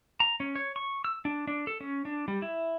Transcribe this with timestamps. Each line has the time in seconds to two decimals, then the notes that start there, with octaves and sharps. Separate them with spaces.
0.20 A#5
0.40 C#4
0.56 C#5
0.76 C#6
1.04 E6
1.25 D4
1.47 D4
1.67 A4
1.81 C#4
2.05 D4
2.28 G3
2.42 E4